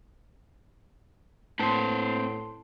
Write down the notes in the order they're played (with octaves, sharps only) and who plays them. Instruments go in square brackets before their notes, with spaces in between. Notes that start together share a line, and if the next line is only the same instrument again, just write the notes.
[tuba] A2 [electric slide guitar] C4 B4 C5 [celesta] A5 C6